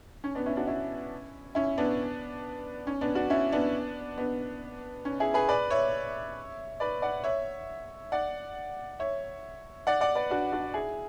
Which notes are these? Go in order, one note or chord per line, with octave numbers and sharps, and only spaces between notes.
C#4
B3 D4
C#4 E4
D4 F#4
C#4 E4
C#4 E4
B3 D4
C#4
B3 D4
D4 F#4
C#4 E4
B3 D4
B3 D4
C#4
E4 G#4
G#4 B4
B4 D5
C#5 E5
B4 D5
D5 F#5
C#5 E5
D5 F#5
C#5 E5
D5 F#5
D5 F#5
B4 D5
D4 F#4
D4 F#4
E4 G#4